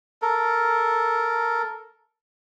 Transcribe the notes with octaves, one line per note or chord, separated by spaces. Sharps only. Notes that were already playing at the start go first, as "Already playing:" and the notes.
A4 A#4